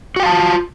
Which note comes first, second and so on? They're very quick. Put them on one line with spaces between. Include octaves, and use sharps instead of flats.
F#4 G5 F5 A5 F4